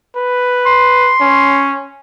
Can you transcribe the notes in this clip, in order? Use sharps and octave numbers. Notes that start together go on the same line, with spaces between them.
B4
C6
C#4